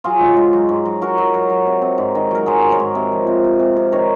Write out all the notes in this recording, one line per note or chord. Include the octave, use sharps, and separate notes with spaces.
F#3 F4 G#4
G#2
G#2
F#3
G#2
F#3
F#3 F#4 A#4
F#3
F#3
F#3
C3
C3
G#2
D#3
F#3 A#4
F#3 G#4 C5
G#2
A#4 C#5
G#2
C3
F3
C3
C3
C3
C3
D#3 A#4 C#5